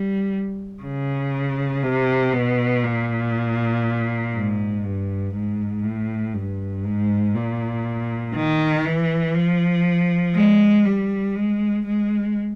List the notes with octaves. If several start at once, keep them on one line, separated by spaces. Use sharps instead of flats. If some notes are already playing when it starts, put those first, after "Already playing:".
Already playing: G3
C#3
C3
B2
A#2
G#2
G2
G#2
A2
G2
G#2
A#2
D#3
E3
F3
G#3
G3
G#3
G#3